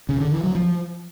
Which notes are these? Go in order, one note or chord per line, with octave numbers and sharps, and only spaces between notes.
C#3
D3
E3
F#3
F3